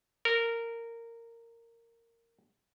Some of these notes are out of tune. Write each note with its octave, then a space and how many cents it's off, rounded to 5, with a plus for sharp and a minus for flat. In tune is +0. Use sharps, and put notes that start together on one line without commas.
A#4 -15